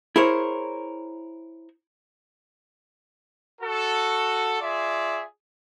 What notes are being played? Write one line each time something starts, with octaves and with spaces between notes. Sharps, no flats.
E4 G#4 A#4 C5 C#5
F#4 A4
F4 G#4 D5 E5